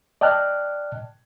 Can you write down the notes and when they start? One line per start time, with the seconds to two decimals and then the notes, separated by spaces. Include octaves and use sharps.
0.21 D5 D#5 G5 A5 F6 F#6